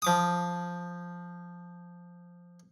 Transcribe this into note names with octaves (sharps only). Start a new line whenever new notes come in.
F3 D6 D#6